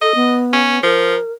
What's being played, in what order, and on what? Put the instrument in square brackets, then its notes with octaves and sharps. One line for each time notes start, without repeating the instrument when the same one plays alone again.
[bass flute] A4 [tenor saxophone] D#5
[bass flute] B3
[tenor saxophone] C#4
[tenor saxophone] F3 [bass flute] A#4